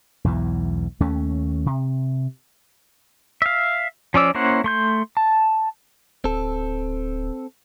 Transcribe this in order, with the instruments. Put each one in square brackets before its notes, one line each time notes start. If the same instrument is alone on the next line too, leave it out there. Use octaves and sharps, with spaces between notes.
[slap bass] B1 E2 G#2 E3
D#2 A3 C#4
C3
[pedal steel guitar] E5 F5
F3 C#4 D5 E6
A#3 C#4 E4 C5 F#5
A3 C6 G6
A5
[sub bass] D1 [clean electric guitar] C4 A4